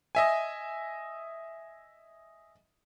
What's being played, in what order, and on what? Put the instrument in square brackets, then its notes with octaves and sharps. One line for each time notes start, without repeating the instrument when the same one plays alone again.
[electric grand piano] D#5 E5 G#5